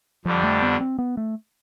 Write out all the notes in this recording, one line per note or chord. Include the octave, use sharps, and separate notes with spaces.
F2 D3 F3 G3 D4
A3
B3
C4
B3
A3